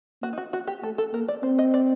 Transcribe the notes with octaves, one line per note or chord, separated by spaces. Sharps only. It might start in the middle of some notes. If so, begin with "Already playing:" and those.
A#3 F#4
D#4
F#4
F#4
G4
A3 A4
A4
A#3 A#4
D5
C4 C5
D#5
D5